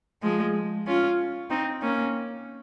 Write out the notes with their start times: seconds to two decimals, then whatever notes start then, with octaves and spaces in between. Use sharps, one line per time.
0.23 F3 G#3
0.87 C#4 F4
1.50 C4 D#4
1.82 A#3 C#4